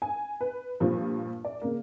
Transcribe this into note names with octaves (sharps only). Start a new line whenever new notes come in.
G#5
B4
G2 A#2 F3
D5
C#3 A#3